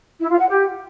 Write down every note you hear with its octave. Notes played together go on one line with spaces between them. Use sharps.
E4
F4
F#5
G4